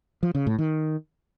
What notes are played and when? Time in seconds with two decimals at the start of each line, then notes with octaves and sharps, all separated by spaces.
0.23 F3
0.35 C#3
0.47 A2
0.58 D#3